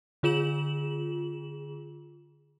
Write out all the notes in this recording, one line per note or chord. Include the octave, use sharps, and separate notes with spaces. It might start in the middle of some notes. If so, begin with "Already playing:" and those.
D3 F4 G#4 E7 F#7